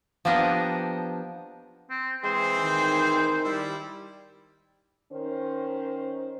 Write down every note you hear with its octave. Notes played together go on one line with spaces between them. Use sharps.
F3 A#3 B3 D4 G4 D#5
C4
E3 G#3 C4 C5
D#3
G3 E4
D#3 C#4 C5